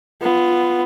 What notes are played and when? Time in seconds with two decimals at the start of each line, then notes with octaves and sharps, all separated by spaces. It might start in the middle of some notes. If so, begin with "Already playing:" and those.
0.22 B3 F4